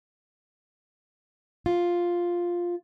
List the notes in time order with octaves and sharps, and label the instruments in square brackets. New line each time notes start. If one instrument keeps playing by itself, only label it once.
[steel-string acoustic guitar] F4